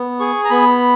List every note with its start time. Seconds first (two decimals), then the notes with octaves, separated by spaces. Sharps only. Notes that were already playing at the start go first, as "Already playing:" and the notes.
Already playing: B3
0.20 G#4 C#6
0.45 A#5
0.50 B3 B5